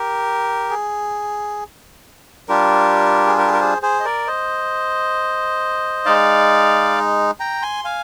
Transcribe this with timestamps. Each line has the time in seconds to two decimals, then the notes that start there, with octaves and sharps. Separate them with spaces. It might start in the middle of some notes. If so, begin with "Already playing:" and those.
Already playing: G4 A#4
0.70 G#4
2.48 G3 D4 F4 G4 A#4
3.27 G#4
3.38 G4 A#4
3.46 G#4
3.53 A#4
3.60 G#4 C5
3.82 G#4 C5
4.00 D#5
4.05 A#4 D5
4.27 C5 D#5
6.05 G#3 D#4 D5 F5
7.40 G5 A#5
7.62 G#5 C6
7.84 F5 G#5